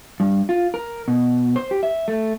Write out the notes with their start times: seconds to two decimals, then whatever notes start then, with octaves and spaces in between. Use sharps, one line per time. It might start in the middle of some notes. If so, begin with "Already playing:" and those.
0.20 G2
0.49 F4
0.74 A#4
1.08 B2
1.56 C5
1.71 G4
1.83 E5
2.08 A3